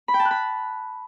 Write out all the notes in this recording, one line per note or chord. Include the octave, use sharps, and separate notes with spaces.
B5
G5
A5
F#6
B5